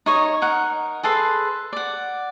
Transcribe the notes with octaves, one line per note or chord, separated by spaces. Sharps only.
D#4 C#5 D#5
D#4 A#4 F#5
G#4 A4 B4 C6
D5 F#5